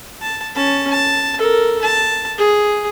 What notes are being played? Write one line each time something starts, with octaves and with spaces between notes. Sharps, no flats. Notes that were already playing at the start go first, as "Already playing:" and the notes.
A5
C#4 A5
A5
A4 A#4
A5
G#4